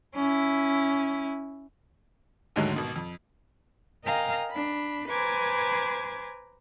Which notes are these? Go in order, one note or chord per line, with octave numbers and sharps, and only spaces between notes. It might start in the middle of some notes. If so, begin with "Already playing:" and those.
C#4 E4
D#2 G#2 D3 F#3 G#3 A3
G#1 B2
F2
A#4 D#5 F5 G5 G#5 A#5
D4 B5
B4 C5 G#5 A#5 D6 G#6